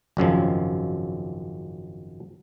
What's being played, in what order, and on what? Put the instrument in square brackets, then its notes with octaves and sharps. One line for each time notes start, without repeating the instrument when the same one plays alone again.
[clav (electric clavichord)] G#1 F#2 C#3 F3